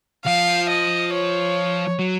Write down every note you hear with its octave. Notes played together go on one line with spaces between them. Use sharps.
F3 F5
D#5
C#5
F#3